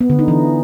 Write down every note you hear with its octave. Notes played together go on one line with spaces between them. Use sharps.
B3
D3
D#4
E3